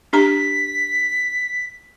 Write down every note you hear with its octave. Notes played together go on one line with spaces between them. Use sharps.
D4 G4 A#5 B6